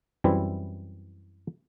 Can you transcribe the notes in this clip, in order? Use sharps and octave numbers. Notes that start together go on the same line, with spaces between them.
F#2 E3 G3 C4 E4